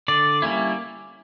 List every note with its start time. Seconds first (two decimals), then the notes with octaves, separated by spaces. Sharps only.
0.08 D3 D5
0.42 G3 A#3 C#4 E4